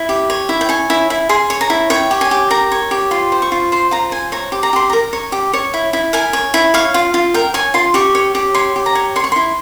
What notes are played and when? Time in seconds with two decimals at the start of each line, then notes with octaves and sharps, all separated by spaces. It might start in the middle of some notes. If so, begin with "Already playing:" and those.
Already playing: E4
0.09 G4
0.30 C#5
0.49 E4
0.61 G5
0.69 C#5 G#5
0.90 E4
1.10 E4
1.29 G#4 C6
1.50 C#5
1.61 A#5
1.70 E4
1.90 C#5 G5
2.11 G4
2.21 G#5
2.31 G4
2.51 A#4 A#5
2.72 C#5
2.91 G4
3.11 F4 C6
3.32 C5
3.42 C#6
3.52 F4
3.72 C5 C6
3.91 F4 A#5
4.11 C5 G#5
4.32 C#5 A#5
4.52 G4
4.63 A#5
4.73 G4 C6
4.90 A#4 A#5
5.13 C#5
5.32 G4
5.53 C#5
5.74 E4
5.93 E4
6.13 A#4 G#5
6.33 C#5
6.54 E4
6.74 C#5 F5
6.94 F4
7.14 F4
7.34 A#4 G5
7.54 C#5 G#5
7.74 F4 C6
7.94 G4 C#6
8.15 C#5
8.35 G4
8.54 C#5 C6
8.76 G4
8.86 A#5
8.95 C#5
9.16 C#5 C6
9.24 C#6
9.32 E4 C6